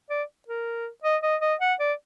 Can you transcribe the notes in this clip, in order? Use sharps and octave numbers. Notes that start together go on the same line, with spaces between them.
D5
A#4
D#5
D#5
D#5
F#5
D5